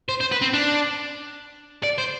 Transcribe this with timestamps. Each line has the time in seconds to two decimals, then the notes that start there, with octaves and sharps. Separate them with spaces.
0.09 C5
0.20 C5
0.31 B4
0.41 C4
0.53 D4
1.83 D5
1.98 C5